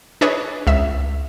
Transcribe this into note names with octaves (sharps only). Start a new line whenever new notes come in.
D4 G#4 B4 C#5 D#5
C#2 E5